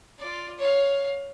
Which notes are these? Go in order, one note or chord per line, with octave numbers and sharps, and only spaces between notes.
F4 D5
C#5 F5